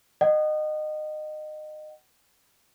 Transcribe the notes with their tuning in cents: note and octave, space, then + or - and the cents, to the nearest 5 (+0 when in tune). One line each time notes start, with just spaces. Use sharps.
D#5 -25 F#5 +35